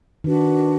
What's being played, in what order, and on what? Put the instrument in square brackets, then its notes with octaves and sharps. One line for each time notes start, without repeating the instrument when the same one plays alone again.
[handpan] D#3 [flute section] D4 F#4 B4